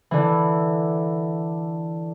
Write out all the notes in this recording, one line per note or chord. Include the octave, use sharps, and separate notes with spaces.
D3 E3